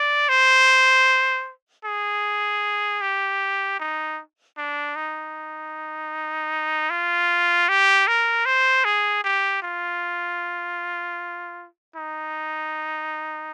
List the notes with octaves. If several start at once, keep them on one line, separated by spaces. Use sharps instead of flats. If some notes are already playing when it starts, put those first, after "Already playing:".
Already playing: D5
C5
G#4
G4
D#4
D4
D#4
F4
G4
A#4
C5
G#4
G4
F4
D#4